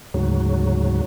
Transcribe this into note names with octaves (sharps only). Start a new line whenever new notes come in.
D2 G#2 C#3 F#3